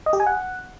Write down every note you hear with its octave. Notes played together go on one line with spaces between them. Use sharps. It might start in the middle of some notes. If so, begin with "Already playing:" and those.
D#5
G4
G#5
F#5